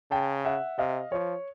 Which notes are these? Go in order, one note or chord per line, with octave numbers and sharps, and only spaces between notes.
C#3 G5 A5
E5 F#5
C3 D#5 F5
F3 C#5